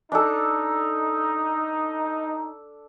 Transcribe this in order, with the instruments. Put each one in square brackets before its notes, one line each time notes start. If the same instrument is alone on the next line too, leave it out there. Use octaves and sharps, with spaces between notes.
[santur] D4 A4 [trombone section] D#4